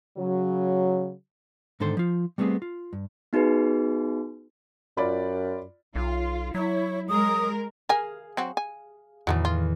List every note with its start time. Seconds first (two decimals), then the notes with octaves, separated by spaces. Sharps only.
0.17 C#3 F#3
1.80 G#2 D3 D#3 A4 C5 C6
1.97 F3 F4
2.38 G3 A3 B3 C4 G#4
2.62 F4
2.93 G2
3.33 B3 D#4 F#4 G#4 B4
4.97 F#2 F4 D5 B5
5.96 B1 F4
6.55 F#3 E4 C#5
7.09 G#3 A#4 D#6
7.89 G#4 A#4 F5 G#5
8.37 F#3 C4 F#4
8.57 G#5
9.27 E2 A2 D#3 F#3 G3 A3
9.45 F4